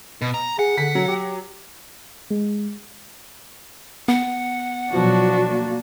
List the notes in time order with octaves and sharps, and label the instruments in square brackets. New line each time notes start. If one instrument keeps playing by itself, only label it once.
[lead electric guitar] B2
A#5
[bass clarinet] G#4 [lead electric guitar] F#5
[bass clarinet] D3 [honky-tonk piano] B6
[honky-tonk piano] F#3
[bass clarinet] G4
[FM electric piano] G#3
[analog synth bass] B3 [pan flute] F#5
[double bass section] B2 F3 F#3 [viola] D4 F#4
[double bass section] A#3